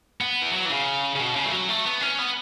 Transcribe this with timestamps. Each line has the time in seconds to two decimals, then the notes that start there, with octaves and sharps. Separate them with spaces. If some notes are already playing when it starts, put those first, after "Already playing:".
0.21 B3
0.42 E3
0.53 F#3
0.66 E3
0.70 C#3
1.15 C#3
1.20 B2
1.36 C#3
1.45 A3
1.52 F#3
1.69 A3
1.85 B3
2.01 C#4
2.18 B3